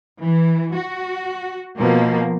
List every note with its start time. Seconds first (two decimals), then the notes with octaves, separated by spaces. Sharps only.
0.21 E3
0.76 F#4
1.79 B2 F3 A#3